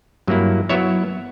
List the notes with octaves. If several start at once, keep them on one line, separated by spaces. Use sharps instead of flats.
G2 F#3 A#3 E4
F#3 B3 E4 C#5 E5